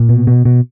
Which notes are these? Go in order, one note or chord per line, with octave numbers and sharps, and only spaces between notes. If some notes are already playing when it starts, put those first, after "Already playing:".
Already playing: A#2
B2
B2
B2